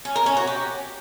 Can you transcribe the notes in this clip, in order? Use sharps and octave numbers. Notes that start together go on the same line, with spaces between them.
C#4
A#4
C#4
F#4
G4